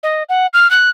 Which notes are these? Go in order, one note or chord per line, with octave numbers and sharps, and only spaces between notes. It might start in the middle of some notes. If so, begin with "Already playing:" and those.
D#5
F#5
F6
F#6